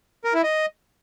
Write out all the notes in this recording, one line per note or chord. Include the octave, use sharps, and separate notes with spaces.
A#4
E4
D#5